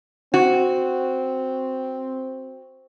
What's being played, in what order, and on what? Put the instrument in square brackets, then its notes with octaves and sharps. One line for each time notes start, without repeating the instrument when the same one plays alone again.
[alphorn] C4 [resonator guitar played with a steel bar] F#4